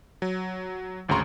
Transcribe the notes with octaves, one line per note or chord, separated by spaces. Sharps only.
F#3
G#1 D2 C#3 A#5 C6 C#6